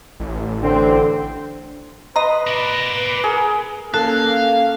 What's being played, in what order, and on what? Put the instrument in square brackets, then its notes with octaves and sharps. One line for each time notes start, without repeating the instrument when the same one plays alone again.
[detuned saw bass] A1
[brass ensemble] D3 C4
[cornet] B4 [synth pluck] D#5 A#5 [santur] C6
[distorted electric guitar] A#4 D5
[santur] G#4 [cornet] A#4
[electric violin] A#3 C#4 [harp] A4 [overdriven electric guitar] F5 [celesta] F#6